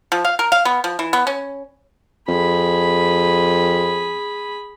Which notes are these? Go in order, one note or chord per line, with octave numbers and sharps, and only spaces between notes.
F3
F5
A#4
F5
B3
F3
E3
B3
C#4
F2 G#4 B5